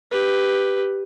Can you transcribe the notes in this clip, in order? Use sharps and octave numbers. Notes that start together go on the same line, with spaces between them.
G4 B4